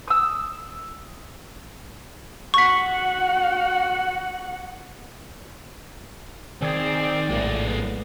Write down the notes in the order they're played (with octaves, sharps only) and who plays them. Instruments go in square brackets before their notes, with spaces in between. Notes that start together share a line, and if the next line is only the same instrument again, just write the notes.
[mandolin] D#6 E6
[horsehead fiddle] F#4 F#5 [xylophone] C#6 B6
[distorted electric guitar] D#3 [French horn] C4 [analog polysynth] G#4 [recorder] D5
[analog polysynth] A#1 A2 [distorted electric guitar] G#3 A#3
[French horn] B3